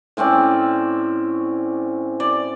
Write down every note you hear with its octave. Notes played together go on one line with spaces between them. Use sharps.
A2 C4 C#4 D5
D5